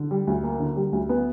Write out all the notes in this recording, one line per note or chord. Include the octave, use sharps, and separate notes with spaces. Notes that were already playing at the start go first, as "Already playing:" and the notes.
Already playing: D3
G3
D2
A#3
D3
G3
D2
B3